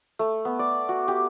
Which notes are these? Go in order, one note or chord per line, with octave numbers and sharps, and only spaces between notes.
A3
B3
D5
F#4
G4